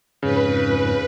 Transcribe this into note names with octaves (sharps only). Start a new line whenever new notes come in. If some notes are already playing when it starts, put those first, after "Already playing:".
F2 G#2 C#3 B4